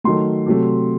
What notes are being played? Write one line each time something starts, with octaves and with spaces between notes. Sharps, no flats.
D#3 F#3 A3 C6
C3 F#3 A3